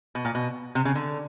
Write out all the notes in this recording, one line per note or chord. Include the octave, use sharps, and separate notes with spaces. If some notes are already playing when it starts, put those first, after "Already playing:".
B2
A#2
B2
C3
C#3
D3